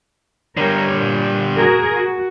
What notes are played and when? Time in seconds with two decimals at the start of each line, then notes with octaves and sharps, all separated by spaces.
0.57 D3 G3 A#4 C#5
0.95 A#2
1.56 F#4 G#4 A#4
1.94 F#4